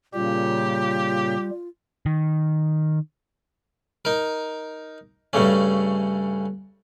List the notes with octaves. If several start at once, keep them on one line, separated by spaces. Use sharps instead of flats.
A#2 C#3 G3 F4 G4
D#3
D#4 A#4
G2 C#3 A3 C#4